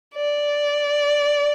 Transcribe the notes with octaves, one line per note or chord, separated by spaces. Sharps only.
D5